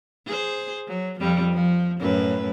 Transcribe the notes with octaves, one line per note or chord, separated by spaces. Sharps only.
G#4 C5
F#3
F2 F3 G3
F3
F#2 A2 B4